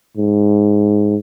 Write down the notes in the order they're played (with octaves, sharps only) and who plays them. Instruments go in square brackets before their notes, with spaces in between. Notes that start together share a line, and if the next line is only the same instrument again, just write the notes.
[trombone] G#2